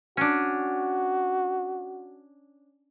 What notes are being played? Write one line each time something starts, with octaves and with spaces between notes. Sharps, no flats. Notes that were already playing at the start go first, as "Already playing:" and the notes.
C#4 D4 F#4